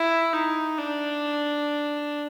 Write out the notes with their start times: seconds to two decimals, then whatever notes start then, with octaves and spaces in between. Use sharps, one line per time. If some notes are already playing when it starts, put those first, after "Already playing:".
Already playing: E4
0.33 D#4
0.78 D4